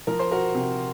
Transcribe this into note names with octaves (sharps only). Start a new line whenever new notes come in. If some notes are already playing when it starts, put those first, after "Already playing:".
F3 A#4
C5
F#4 A#4
C3